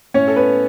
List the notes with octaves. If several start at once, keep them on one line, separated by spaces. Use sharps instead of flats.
A2 C#4 C#5
A4
B3 B4